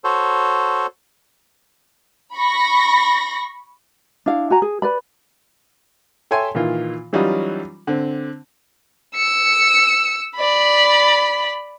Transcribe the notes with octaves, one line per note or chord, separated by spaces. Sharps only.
F#4 A4 C5 C#5
B5 C#6 A#6
D4 E4 F5
F#4 G#5 A#5
G#4
B4 D5 B5
A4 C#5 E5 G5 G#5 C6
A#2 D#3 E3 F4
E3 F#3 G3 C#4 D#4 F4
D3 C4
E6 C#7
D5 B5